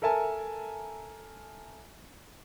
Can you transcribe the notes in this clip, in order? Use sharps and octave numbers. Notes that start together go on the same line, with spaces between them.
A4 A#4 E5 G#5 A5